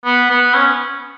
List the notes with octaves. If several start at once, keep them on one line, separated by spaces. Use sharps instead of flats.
B3
B3
C#4